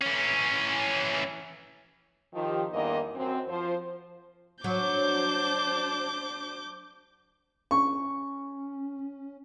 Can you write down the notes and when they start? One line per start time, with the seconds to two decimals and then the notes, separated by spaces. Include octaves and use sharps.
0.02 E3 C#4
2.34 D#3 F3 G4
2.72 E2 G2 D#3 A#3 D#5
3.16 F#2 C4
3.49 F3 C5
4.64 F#3 D4 C5 D6 G6
7.71 C#4 C#6